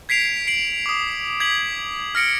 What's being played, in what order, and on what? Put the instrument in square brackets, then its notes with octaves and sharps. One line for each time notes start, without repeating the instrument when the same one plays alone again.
[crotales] G#6 B6 C7 D7 F7
C7 D7 F#7
D6 D#6
G#6 B6 F#7
F6 A#6 C#7 D7